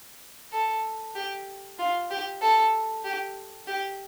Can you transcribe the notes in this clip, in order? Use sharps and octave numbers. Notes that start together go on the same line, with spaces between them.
A4
G4
F4
G4
A4
G4
G4